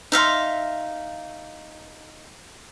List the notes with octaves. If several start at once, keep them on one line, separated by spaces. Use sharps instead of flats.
D#4 E5 F5 C6